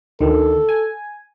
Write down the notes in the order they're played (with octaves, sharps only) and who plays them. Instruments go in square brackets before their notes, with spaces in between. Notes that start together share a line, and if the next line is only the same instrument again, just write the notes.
[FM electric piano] D2 D#3 [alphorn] A4
[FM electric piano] G#5